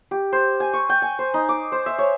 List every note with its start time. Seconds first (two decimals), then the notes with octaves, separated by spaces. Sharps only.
0.11 G4
0.32 C5
0.60 G#5
0.73 C#6
0.89 G5
1.02 G#5
1.19 C5
1.34 D#4
1.49 D6
1.72 C5
1.86 E5
1.99 C#5